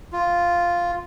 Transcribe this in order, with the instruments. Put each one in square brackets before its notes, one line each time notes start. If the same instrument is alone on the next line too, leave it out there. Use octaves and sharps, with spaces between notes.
[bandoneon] F4